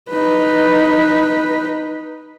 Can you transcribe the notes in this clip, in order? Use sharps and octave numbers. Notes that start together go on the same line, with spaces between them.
D#4 B4